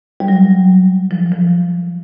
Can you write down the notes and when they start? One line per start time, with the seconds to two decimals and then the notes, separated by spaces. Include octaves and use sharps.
0.20 G3
0.28 F#3
1.11 F3
1.32 F3